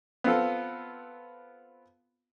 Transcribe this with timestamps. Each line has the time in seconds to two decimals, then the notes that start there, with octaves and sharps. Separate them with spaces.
0.24 B3 C4 F4 A4